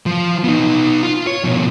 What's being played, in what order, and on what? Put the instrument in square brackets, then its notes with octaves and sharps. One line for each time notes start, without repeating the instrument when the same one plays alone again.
[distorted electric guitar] F3
B3 D#4
F4
C#5
B2 F3